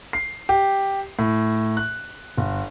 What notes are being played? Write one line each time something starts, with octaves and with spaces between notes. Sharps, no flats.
C7
G4
A2
F#6
G1